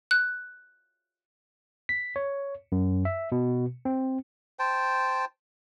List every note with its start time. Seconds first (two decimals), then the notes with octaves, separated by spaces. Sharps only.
0.11 F#6
1.89 B6
2.16 C#5
2.72 F#2
3.05 E5
3.32 B2
3.85 C4
4.59 C5 G5 A5